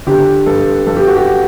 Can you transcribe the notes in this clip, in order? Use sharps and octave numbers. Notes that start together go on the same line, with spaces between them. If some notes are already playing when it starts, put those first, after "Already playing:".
D3 G4
G2 A4
G2 A4
G4
F#4
G4